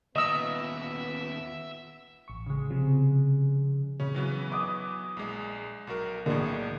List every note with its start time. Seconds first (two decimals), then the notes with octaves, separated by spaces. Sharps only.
0.16 D#2 B3 F4 D#5 E5 E6
2.28 A1 C#6
2.46 C#3 G#3
2.70 C3 F3
4.00 C#3 C#4
4.14 E3 F#3 B3
4.52 D6 D#6
5.17 A#1 G#3
5.87 B1 F#4 A#4
6.26 B1 A2 D3 A#3 G#4